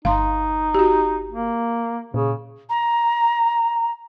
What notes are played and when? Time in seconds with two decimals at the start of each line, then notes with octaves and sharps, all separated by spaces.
0.05 G1 D#4 F5 C6
0.75 F#4 G4
1.32 A#3
2.14 A#2 C#3
2.69 A#5